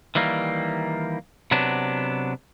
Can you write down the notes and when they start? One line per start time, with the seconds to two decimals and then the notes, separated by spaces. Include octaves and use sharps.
0.15 D#3 E3 G3 A#3
1.51 C3 F#3 B3 D4